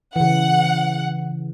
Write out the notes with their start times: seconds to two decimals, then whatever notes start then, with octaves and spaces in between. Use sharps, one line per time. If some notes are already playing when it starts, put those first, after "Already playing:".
0.16 C#3 E3 F#5